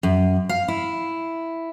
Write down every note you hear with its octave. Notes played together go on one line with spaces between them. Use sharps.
F#2
F5
E4